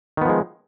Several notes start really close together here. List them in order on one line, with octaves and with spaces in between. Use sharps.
D#3 B3 F3 G#3